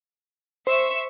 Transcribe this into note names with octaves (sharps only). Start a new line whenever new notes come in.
C5 E5 C#6 E6